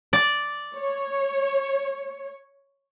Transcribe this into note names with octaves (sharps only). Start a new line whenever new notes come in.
D5
C#5